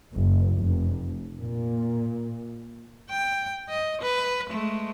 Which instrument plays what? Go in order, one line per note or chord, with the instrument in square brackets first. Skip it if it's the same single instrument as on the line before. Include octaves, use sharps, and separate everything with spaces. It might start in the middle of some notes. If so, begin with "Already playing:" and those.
[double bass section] F#1
F1
A#2
[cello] G5
D#5
B4
G#3 A3